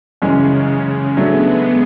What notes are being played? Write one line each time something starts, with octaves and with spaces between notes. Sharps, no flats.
F#2 C#3 E3 G#3 C#4 G#4
F#3 G#3 A3 B3 D4